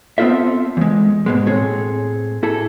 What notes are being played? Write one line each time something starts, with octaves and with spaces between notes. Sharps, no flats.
B3 C4 E4 F4 A4 E5
E2 G#3
G#2 B2 G#3
A2 C4 G#4 A4
E4 G#4 A4